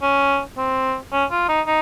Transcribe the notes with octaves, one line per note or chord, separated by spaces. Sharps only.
C#4
C4
C#4
F4
D#4
D#4